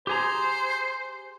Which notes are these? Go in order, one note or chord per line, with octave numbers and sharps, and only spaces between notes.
G4 G#4 C5 A#5